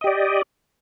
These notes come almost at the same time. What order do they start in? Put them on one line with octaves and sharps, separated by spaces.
D#5 G4 D5